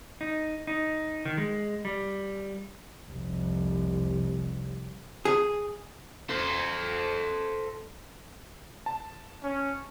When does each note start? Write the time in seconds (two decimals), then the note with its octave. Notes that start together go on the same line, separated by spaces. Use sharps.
0.21 D#4
0.67 D#4
1.25 D#3
1.38 G#3
1.85 G3
3.10 F1 C2
5.25 G#4
6.30 A4 C5
8.86 A5
9.43 C#4